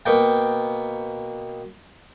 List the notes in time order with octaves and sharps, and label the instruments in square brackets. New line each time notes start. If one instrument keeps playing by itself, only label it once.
[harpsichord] B2 A#3 G5